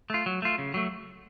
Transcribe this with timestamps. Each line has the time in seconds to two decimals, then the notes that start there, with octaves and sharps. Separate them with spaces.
0.10 A3 F4
0.26 F#3
0.42 A3 F4
0.58 C#3
0.74 F#3 A3